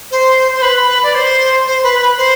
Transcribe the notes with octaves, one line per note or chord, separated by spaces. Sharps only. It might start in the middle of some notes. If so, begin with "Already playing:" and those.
C5
C5
B4
D5
C5
C5
B4
B4
C5